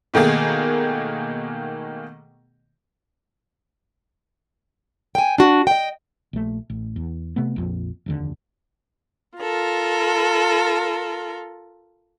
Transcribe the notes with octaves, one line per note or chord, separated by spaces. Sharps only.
B2 D#3 A3 A#3 G#4
G5 G#5
D4 F#4
D#5 G5
A#1 A3
A1
E2
C3 A3 B3
A#1 F2
F1 D#2 D3
F4 A4 A#4